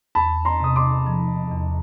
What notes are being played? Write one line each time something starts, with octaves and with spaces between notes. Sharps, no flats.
E2 A5 B5
A#5 C6
C3 D#6
C6 D6
F3
E2